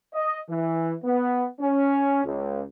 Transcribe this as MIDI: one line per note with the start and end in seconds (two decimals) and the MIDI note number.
0.14 0.38 75
0.49 0.94 52
1.04 1.46 59
1.60 2.24 61
2.25 2.62 37